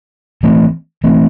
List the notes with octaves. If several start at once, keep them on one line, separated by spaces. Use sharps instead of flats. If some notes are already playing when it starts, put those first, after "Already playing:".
E3 A3 C4
E3 A3 C4